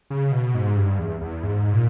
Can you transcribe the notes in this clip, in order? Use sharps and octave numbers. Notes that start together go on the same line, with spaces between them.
C#3
B2
G#2
G2
E2
E2
G#2
A#2